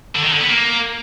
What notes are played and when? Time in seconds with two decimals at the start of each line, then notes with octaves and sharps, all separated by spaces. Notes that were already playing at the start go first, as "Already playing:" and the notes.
0.15 D3
0.24 D#3
0.32 D3
0.41 B3
0.49 A#3